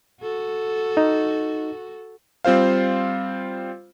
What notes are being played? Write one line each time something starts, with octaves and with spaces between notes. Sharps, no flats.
F#4 A4
D#4
G3 C4 F4 C5 F5